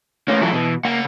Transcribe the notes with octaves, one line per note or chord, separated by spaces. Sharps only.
A3 A#3 C#4
E3 F#3 E4 A4
B2 E3
C#3 A#3 F#5